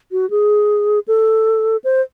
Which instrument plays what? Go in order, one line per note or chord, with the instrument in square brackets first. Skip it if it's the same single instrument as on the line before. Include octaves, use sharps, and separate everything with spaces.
[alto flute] F#4
G#4
A4
C5